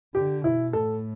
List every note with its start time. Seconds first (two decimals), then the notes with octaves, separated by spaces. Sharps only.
0.15 D3 G4
0.44 B2 E4
0.73 A2 A4